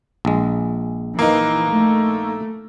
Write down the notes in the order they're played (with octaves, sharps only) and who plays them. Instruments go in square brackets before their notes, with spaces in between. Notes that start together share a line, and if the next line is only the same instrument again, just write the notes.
[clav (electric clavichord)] A#1 G#3
[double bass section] E3 [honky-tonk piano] A#3 D#4
[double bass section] A3